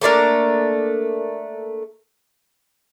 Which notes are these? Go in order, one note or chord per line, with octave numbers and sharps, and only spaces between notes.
A3 A#3 D4 A#4